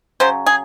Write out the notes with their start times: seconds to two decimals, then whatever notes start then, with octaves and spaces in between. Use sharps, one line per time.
0.20 C#3 F#3 C5
0.46 G#4